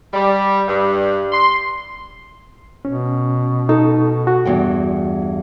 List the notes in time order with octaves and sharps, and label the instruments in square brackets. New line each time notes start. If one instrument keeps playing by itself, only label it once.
[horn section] G3
G2
C6
[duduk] B2 [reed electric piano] C#4
[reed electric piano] D#4 [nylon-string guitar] A4
[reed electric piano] F#4
[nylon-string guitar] E2 G2 G5